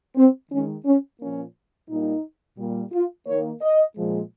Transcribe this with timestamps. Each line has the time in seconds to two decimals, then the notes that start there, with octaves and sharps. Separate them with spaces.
0.16 C4
0.51 D#3 G#3 C#4
0.85 C#4
1.20 A#2 F3 A#3 C#4
1.88 A#2 G3 A#3 D#4
2.58 A#2 G3 A#3
2.93 F4
3.27 D#3 A#3 C#5
3.61 D#5
3.96 A#2 F3 G#3